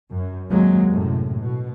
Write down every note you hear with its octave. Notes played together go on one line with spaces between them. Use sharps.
F#2
D#2 C3 F#3 G#3 A#3
F#2 A2 C3
B2